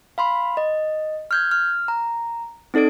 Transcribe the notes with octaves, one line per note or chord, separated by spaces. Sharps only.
F5 B5 C6
D#5
F6 G6 G#6
F6
A#5
C4 D#4 A4 D5 D7